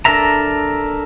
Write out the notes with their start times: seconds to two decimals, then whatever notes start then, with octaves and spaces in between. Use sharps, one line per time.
0.05 D4 A4 A#4 E5 A#5